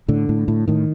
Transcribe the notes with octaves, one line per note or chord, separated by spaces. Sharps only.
A2 D3
A2
A2
A2 D#3